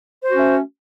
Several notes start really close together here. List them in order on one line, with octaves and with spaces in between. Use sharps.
C5 F#4 C#4 A3